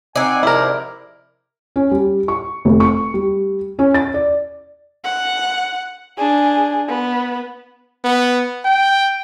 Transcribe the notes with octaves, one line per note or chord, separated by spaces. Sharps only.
C4 D#4 D5 F#5 G#5
G#2 C3 F3 E4 A#4
C#4
G3
C#6
F1
C#6
G3
C#4
A6
D5
F#5
D4 G#4
B3
B3
G5